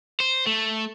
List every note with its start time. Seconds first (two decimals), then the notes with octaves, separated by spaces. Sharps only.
0.20 C5
0.47 A3